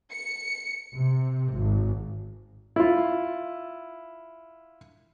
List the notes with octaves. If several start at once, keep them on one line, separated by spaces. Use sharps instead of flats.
C#7
C3
G#1
E4 F4